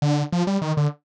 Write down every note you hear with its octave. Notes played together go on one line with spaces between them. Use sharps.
D3
F3
G3
D#3
D3